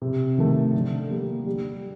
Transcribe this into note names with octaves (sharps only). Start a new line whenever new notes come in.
C3
D#3 A3
D3
G3 A#3
G3